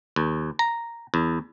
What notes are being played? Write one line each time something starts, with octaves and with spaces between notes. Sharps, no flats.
D#2
A#5
E2